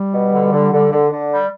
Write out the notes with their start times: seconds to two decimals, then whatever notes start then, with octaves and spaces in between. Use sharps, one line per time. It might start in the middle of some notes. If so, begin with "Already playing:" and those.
Already playing: G3
0.13 B2
0.32 D3
0.52 D3
0.72 D3
0.91 D3
1.11 D3
1.31 G3